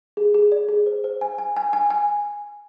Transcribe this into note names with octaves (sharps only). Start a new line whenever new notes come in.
G#4
G#4
D5
G#4
C5
C5
G#5
G#5
G#5
G#5
G#5